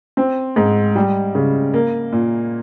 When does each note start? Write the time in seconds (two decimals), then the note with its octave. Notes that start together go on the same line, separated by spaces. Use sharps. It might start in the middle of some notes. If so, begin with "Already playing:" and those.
0.17 C4
0.56 G#2
0.96 G3
1.35 C#3
1.74 A#3
2.12 A#2